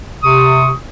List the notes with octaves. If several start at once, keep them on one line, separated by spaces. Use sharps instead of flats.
C3 C#6 D#6